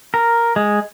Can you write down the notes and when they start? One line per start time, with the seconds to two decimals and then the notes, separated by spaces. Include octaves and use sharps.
0.14 A#4
0.56 G#3